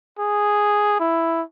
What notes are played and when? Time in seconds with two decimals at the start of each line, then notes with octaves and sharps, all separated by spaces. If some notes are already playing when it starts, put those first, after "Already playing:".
0.19 G#4
1.00 E4